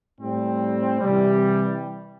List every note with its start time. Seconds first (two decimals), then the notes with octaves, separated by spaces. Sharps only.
0.21 A2 G3 C4
1.00 C3 E3 G3